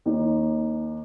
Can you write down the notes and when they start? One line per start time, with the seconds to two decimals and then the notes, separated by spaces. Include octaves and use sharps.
0.05 D#2 D#4